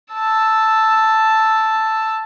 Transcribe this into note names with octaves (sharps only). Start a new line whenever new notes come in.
A5 E6